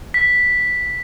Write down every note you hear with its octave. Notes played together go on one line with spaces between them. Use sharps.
B6